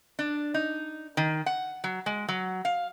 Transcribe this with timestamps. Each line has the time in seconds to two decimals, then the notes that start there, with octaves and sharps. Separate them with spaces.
0.19 D4
0.54 D#4
1.17 D#3
1.46 F#5
1.84 F#3
2.06 G#3
2.28 F#3
2.65 F5